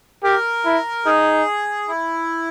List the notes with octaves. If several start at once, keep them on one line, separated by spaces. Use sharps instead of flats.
G4 A#4
E4
D#4 G#4
E4